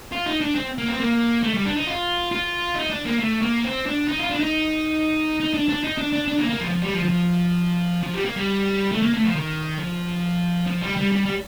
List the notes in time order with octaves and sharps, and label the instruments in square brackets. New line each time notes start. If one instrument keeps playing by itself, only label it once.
[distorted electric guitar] F4
D#4
D4
C4
A#3
C4
A#3
A3
G3
D4
D#4
F4
F4
D#4
D4
A#3
A3
A#3
C4
D4
D#4
F4
D4
D#4
D#4
D4
D4
D#4
D4
D4
D4
A#3
A#3
F3
F3
G3
F3
F3
F3
G3
A#3
G3
A3
A#3
A3
F3
D#3
F3
F3
G3
G3
G3
G3